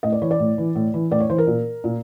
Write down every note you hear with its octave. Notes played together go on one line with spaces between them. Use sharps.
A2 D#5
D5
E3 C#5
D5
A2
E3
A2
E3
A2 D5
C#5
E3 C5
A#4
A#2
A#2